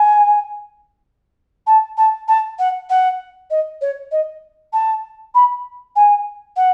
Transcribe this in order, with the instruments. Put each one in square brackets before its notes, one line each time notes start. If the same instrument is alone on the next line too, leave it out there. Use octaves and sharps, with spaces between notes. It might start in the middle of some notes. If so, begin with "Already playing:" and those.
Already playing: [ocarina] G#5
A5
A5
A5
F#5
F#5
D#5
C#5
D#5
A5
B5
G#5
F#5